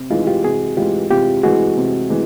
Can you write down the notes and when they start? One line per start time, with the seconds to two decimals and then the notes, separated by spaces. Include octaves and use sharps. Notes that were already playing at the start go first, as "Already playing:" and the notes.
Already playing: C3
0.10 E3 G#3 D#4 F4
0.27 F4 G4
0.44 C3 F#4 G#4
0.77 E3 G#3 F4 G4
1.10 C3 F4 G4
1.43 E3 G#3 F#4 G#4
1.77 C3
2.10 E3 G#3